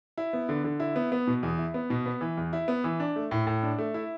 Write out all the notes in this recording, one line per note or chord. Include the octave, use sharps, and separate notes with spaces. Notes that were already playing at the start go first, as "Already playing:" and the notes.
E4
B3
D3
D3
E4
B3
B3
B2
E2
E4
B3
B2
B3
E3
E2
E4
B3
E3
D4
A3
A2
A2
D4
A3
E4